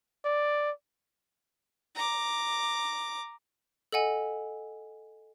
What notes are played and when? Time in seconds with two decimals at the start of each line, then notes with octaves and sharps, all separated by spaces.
0.25 D5
1.95 A#5 D6
3.92 A4 D#5 F#5 G#5